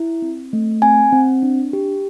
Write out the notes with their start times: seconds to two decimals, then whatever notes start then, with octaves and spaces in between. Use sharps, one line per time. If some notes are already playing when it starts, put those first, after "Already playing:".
Already playing: E4
0.22 C4
0.53 A3
0.82 C4 G#5
1.12 C4
1.43 D4
1.73 G4